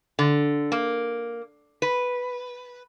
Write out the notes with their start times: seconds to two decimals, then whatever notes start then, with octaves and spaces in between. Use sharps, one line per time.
0.19 D3
0.72 A#3
1.82 B4